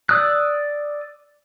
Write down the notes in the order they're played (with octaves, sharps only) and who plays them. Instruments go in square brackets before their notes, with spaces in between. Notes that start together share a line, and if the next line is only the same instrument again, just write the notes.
[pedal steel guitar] D5 D#6 E6 F#6